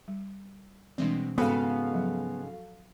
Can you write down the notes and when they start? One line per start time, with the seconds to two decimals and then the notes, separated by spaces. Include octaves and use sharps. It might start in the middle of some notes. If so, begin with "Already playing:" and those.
0.08 G3
0.98 B2 E3 G3 G#3 C4 D4
1.38 G#2 C#3 B3 C4 F#4 A4 F5
1.93 F3 F#3